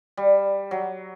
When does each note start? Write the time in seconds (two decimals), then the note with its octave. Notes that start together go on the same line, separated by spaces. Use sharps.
0.17 G3
0.71 F#3